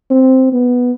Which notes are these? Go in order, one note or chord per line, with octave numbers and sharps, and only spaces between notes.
C4
B3